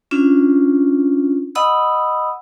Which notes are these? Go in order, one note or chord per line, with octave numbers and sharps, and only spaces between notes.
C#4 D4 F4
D#5 F#5 B5 D#6 E6